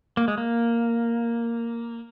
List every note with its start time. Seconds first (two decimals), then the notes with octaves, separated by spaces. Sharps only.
0.17 A#3
0.28 G#3
0.38 A#3